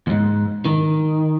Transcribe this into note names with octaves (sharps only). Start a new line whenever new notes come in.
D#2 G#2
D#3